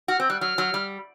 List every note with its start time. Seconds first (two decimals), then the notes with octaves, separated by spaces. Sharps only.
0.08 F#4 F6
0.20 C4 G6
0.30 G3 F#6
0.41 F#3 F6
0.58 F#3
0.74 G3